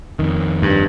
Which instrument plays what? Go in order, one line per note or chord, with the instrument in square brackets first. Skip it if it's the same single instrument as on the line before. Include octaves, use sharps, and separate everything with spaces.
[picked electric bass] F2 D#3
[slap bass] G2